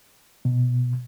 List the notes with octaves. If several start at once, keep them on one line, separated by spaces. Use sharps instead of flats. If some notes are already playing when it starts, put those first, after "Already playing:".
B2